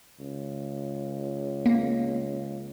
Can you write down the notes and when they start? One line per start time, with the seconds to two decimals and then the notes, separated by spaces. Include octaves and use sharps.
0.20 C#2
1.66 A#3